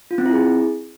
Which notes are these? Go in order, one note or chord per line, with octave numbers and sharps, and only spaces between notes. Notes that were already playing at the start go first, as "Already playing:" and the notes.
F4
C4
E4
G#4